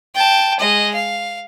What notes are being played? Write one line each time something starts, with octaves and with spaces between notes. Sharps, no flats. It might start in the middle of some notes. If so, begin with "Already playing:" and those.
G5 A5
G#3 D#5
F5